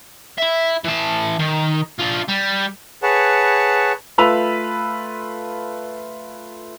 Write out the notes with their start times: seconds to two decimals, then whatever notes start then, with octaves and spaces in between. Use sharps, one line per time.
0.38 E4 E5
0.85 E3 A5
1.39 D#3
1.99 D4 F4
2.28 G3
3.03 G#4 B4 C#5 F#5 A5
4.18 A3 F4 B4 B5 E6 F7